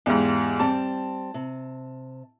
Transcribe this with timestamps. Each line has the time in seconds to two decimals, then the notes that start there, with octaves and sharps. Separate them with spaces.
0.06 E2 G#2 E4 G4 F5
0.60 G3 C4 A5
1.34 C3